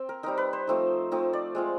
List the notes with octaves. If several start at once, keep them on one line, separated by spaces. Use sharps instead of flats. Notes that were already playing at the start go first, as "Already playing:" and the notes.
Already playing: C4
A#4
G3 C4 D#4 A#4
B4
C5
F3 A3 C4 D#4
F3 A3 C4 D#4
D5
G#3 C4 F4